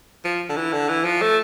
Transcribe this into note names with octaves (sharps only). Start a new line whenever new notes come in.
F3
D3
E3
D3
E3
F3
A3